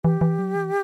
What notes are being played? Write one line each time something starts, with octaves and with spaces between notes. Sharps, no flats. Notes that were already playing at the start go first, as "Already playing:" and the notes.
E3 G4
E3
F#3
E3